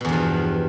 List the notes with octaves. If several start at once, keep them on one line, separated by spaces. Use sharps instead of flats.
E2 G2 B2 F3